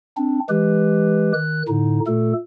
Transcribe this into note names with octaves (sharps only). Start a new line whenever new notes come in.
C4 D4
E3 G#3 G4 B4
D#3 F#6
A2 D3 D#4
A#2 A3 A4